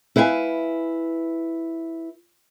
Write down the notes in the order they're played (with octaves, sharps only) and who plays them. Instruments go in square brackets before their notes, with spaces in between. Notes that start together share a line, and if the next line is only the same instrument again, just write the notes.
[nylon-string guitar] E4 B4 F5 G5 G#5